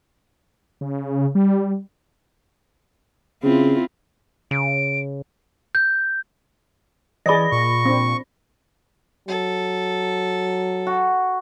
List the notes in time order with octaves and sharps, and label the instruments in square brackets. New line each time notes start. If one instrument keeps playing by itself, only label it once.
[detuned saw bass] C#3
G3
[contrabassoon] C#3 [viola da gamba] C4 E4 F4
[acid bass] C#3 [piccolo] D7
[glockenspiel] G6
[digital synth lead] E3 [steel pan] G#4 D5 D#5 [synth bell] B5 A#6
[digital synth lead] A#2 [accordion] C#6
[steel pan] C4 D4
[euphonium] F#3 [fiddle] A4
[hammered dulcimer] F#4